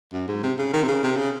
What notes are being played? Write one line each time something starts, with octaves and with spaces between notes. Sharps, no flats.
F#2
G#2
C3
C#3
D#3
C3
C#3
C3
C#3